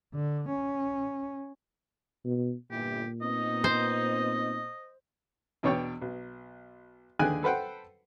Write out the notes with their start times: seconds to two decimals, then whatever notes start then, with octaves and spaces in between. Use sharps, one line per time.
0.14 D3
0.49 C#4
2.25 B2
2.71 G1 A#2 E3 G4
3.22 B3 C4 D#4 D#5
3.64 C5
5.63 E2 B2 D4 C#5 D5 G5
6.01 B1
7.19 D#2 D3 G#4 G5 G#5 F#6
7.43 A4 B4 C5 F#5 G5